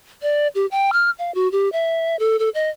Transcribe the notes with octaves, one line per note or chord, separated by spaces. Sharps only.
D5
G4
G5
F6
F5
F#4
G4
E5
A4
A4
D#5